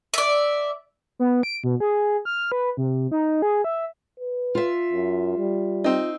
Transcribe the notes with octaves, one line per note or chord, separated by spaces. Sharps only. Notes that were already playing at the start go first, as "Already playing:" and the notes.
D5 E5
B3
D7
B2
G#4
F6
B4
C3
D#4
G#4
E5
B4
F4 E5
F#2
G3
C4 D#4